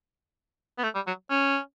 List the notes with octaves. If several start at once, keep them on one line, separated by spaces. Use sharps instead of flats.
B3
A3
G3
F#3
C#4